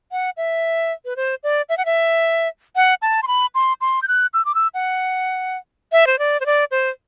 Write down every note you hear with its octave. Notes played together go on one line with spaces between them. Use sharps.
F#5
E5
B4
C5
D5
E5
F#5
E5
F#5
A5
C6
B5
C6
C6
G6
F#6
E6
D6
E6
F#5
E5
C5
D5
C5
D5
C5